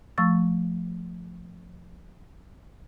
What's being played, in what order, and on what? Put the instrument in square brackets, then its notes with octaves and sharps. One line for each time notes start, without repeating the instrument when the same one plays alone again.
[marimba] F3 A3 C#6 E6 A6